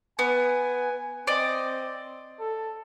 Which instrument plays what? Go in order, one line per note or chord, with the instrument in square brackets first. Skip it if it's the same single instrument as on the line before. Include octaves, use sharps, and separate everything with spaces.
[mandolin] B3 [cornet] G#5
[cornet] C4 [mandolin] D5 D#5
[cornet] A4